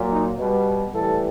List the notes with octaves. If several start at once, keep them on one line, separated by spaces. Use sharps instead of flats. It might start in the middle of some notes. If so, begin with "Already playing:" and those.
Already playing: A#2 F#3
D#4
B2 G3
A2 E3 G3 A4